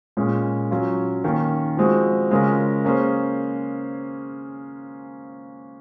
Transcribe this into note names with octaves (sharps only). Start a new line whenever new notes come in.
A#2 G#3 C#4
F#3 C#4 F4
D#3 A#3 C#4
F3 G#3 C4 F#4
C#3 G#3 C#4 F4 A#4
A#3 C#4 G#4 C5